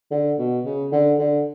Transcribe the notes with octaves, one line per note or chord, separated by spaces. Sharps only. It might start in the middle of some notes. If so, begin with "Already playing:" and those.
D3
B2
C#3
D3
D3